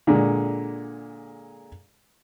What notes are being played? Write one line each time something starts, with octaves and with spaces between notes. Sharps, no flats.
A#2 D3 G#3